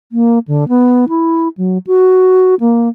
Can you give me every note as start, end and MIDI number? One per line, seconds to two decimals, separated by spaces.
0.12 0.39 58
0.48 0.68 50
0.68 1.05 59
1.09 1.48 64
1.57 1.78 54
1.87 2.55 66
2.60 2.89 58